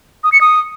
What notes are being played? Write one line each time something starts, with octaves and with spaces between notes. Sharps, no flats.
D#6
C#7
D#6